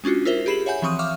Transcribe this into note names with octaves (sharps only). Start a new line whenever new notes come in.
G#3 C#4 D4 F4 F#4
E4 F4 A#4 C5 E5
G4 G#4 B5 C7 E7 F#7
C#5 E5 F#5 G#5 G6
E3 F3 C4 C#6 D#6 D#7
E5 F5 C#6 D6 F6